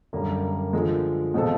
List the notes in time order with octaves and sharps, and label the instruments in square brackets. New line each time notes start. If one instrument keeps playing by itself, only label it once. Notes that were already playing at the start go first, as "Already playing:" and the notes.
[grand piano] F#2 D3 G3 A#3 D4
D3 F3 G#3
B2 G#3 C4 F4 A4